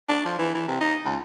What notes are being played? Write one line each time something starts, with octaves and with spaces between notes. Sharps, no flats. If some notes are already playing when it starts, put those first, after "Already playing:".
D4
F3
E3
E3
C3
D#4
C#2